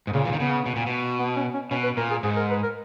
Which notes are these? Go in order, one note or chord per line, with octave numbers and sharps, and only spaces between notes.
G#2
A#2 C#3
E3
D#3
C#3 B3
B2
A#2
B2
B3
C#4
C#4
B2 C#4
B4
A#2 A#4
G#4
G#2 G#4
A#4
B4
A#4